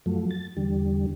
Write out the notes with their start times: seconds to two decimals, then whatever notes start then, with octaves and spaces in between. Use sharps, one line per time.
0.06 F#2 F3 F#3 A3
0.31 A6
0.57 E2 D3 G3